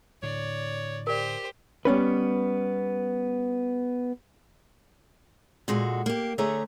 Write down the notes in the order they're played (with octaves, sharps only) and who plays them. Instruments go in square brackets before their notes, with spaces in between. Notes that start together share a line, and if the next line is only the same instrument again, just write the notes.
[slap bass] A2 D3 [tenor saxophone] C#5 [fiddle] D5
[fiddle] G4 C5 [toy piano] A#4 D5
[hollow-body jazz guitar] G3 B3 C#4 B4
[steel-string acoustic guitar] A#2 G#3 F#4 A4
A#3 G4
D3 A3 G#4 C#5 E5 A#5